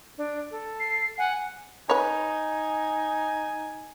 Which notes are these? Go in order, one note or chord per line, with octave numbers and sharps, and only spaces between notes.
D4
A4
C7
F#5 G#5
D#4 B4 C#5 G#5